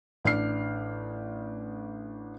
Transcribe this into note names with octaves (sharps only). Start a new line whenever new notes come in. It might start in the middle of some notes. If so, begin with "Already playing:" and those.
A1 D4 F6 C7